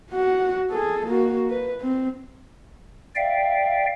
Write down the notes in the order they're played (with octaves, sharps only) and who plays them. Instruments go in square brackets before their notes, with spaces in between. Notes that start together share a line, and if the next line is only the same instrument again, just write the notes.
[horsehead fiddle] F#4 F#5
G#4 A4
A#3 F#4
B4
C4
[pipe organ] D5 E5 F5 G5